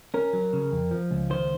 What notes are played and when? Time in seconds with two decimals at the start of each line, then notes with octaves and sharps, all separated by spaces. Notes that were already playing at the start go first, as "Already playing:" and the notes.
0.14 C#4 A#4
0.33 F#3
0.53 C#3
0.72 F2
0.91 F3
1.11 C#2
1.30 D#3 C5